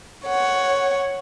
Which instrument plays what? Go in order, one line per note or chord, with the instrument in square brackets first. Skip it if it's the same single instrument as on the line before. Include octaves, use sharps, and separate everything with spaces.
[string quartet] C#5 F#5